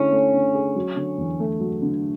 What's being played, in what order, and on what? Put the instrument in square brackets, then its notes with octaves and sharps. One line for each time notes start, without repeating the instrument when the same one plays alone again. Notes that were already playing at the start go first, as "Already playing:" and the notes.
Already playing: [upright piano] D3 A3 E4 G#4 [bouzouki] C#4
[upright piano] A3
D3
G#4
F#3
D3
E2
A3
F#3
D3